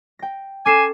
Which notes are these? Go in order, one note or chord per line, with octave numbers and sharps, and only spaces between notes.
G5 A#6
C#4 A4 G#5 D6 C7 E7